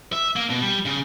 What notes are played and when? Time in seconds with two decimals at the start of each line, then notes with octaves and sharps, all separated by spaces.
0.12 E5
0.36 A#3
0.50 B2
0.62 G3
0.85 C#3